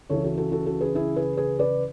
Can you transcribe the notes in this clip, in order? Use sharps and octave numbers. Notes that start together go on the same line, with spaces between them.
C#2 C#3 E3 A4 C#5
F#4 A4
F#4 A4
F#4 A4
F#4 A4
G#4 B4
E4 G#4
G#4 B4
G#4 B4
B4 D5